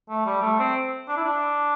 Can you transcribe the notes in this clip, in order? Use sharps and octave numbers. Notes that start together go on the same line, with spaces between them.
A3
G3
A3
C4
D4
E4
D4